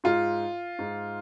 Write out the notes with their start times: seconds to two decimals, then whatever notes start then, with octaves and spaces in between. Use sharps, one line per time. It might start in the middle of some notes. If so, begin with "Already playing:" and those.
0.04 G#2 F4
0.79 G#2